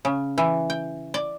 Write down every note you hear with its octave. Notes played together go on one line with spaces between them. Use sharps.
C#3
E3
G5
D5